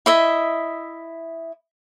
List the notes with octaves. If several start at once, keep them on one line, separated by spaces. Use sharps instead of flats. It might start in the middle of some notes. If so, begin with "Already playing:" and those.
E4 D#5 E5